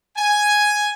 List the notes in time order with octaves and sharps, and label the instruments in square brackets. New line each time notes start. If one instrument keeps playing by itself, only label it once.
[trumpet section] G#5